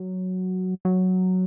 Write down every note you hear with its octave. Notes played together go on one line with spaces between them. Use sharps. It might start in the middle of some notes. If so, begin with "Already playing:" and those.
Already playing: F#3
F#3